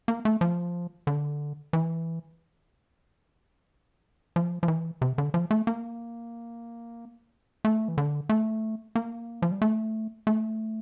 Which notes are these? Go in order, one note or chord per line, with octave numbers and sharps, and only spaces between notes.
A#3
A3
F3
D3
E3
F3
F3
E3
C3
D3
F3
A3
A#3
A3
E3
D3
A3
A#3
F3
G3
A3
A3